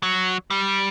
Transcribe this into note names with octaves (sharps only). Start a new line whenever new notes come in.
F#3
G3